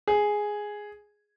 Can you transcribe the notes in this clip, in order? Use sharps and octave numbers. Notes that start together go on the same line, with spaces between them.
G#4